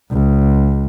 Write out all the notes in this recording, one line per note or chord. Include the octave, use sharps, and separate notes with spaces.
C#2